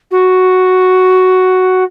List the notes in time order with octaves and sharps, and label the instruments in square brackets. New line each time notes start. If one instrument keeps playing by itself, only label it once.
[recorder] F#4